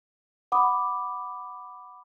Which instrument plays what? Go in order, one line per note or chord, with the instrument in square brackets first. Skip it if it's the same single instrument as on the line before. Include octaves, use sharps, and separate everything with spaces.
[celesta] F#5 B5 D6 D#6